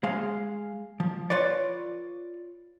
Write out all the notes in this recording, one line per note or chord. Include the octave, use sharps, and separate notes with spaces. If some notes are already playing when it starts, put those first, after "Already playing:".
G#3 G#4 F5
F3
F4 B4 C#5 D5